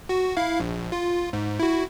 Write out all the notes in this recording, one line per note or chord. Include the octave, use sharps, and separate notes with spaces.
F#4
E4 F5
A#1
F4
G#2
E4 F#4